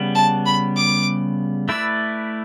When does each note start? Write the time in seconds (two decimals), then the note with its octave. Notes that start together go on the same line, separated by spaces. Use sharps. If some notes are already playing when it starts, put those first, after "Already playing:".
Already playing: C#3 G3 B3
0.15 A5
0.46 B5
0.76 D6
1.68 A3 E4 B4 D5 E6